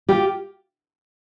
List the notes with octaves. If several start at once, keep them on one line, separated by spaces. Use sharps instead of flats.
F4 G4